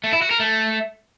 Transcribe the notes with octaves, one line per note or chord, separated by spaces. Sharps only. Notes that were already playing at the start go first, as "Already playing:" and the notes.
A3
E4
F#4
A#4
A3